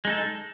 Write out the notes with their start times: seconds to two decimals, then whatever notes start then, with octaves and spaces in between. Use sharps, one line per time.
0.05 G#3
0.07 D#4
0.10 A4